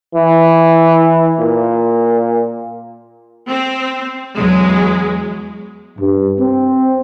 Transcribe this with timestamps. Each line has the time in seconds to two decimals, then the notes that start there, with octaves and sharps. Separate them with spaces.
0.15 E3
1.40 A#2
3.49 C4
4.36 E2 F#3 G#3
5.98 G2
6.39 C4